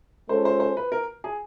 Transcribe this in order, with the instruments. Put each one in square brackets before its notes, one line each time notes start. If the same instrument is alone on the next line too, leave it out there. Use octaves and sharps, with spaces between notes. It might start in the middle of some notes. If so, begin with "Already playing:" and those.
[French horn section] G#3 C#4 F4 A4 [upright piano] C5
[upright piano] C5
C5
B4
A#4
G#4